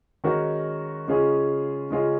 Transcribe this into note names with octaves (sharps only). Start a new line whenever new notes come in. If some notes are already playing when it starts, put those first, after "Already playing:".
D#3 G#3 C#4 F#4 A#4
C#3 G#3 C#4 F4 G#4
C#3 G#3 C#4 F4 G#4